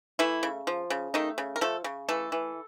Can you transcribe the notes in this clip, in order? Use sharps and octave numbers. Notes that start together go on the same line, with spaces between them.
E3 A3 E4
C#3
F3
C#3
D#3 A3 D#4
C#3
A#4
F3 A3 A4
C#3
E3 A3 A4
E3